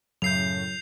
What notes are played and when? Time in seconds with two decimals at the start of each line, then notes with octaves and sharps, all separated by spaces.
0.22 F#2 A2 C#3 F#3 G6 C7 F7